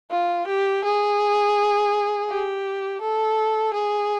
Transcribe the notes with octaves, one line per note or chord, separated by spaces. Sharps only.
F4
G4
G#4
G4
A4
G#4